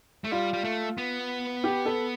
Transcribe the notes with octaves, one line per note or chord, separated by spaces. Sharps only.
A3
G3 F4
G3
A3
B3
G4
A4